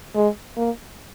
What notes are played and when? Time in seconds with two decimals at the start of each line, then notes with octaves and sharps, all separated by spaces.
0.15 G#3
0.57 A#3